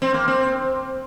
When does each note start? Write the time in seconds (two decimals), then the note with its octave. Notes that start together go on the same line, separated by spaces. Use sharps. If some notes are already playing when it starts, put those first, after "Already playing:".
0.02 C4
0.14 A#3
0.28 C4